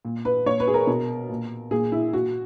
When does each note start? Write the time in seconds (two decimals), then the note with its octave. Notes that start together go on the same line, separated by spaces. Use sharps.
0.05 A#2
0.25 B4
0.46 A#2 C#5
0.60 B4
0.67 G#4
0.74 A#4
0.87 B2
1.29 A#2
1.71 A#2 G#4
1.92 E4
2.13 A#2 F#4